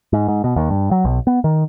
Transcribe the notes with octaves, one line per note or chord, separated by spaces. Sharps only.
G#2
G#2
B2
D#2
G2
F#3
B1
B3
D#3